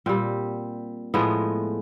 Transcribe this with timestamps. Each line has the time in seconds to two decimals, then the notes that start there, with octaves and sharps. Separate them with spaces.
0.06 A#2 G3 C4
1.14 A2 F3 G#3 B3